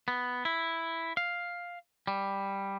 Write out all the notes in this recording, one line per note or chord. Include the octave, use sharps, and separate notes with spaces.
B3
E4
F5
G3